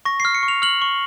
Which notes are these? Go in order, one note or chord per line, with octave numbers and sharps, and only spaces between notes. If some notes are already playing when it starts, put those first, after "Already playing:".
C#6 A#6
C7
F6
C#7
C#6
F7
F6 F#7
C#6